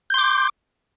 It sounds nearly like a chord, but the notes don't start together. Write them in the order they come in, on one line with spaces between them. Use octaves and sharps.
G6 C6 D6